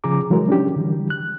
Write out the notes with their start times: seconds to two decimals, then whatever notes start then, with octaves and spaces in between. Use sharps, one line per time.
0.04 C#3 F3 G#4 A#5 D6
0.30 E3 F#3 G#3 E4 A#4
0.48 C#4 D4 G4
0.76 D3 E3 G3
1.10 F#6